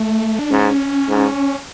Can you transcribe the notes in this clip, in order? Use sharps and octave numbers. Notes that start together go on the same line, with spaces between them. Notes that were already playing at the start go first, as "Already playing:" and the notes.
Already playing: A3
D4
G#2 C#4
G#2